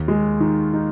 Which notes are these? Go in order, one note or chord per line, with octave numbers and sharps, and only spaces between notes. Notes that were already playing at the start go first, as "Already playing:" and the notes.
Already playing: D#2
G#3
D#3
D#4